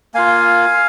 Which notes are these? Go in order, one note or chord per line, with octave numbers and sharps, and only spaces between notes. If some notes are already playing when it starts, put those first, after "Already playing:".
A#3 F4 F5 G#5